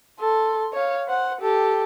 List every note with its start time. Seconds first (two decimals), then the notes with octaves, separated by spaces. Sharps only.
0.20 A4 C6
0.73 C#5 F5
1.08 C5 F#5
1.41 G4 A4